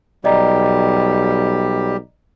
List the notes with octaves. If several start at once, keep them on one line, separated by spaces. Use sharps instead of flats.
B1 G3 G4 D5 D#5 A#5